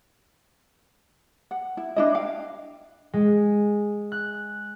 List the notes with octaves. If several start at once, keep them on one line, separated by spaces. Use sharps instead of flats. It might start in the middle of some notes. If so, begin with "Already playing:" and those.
F#5
E4
D4 E4 D#5
F5 G5
G#3
F#6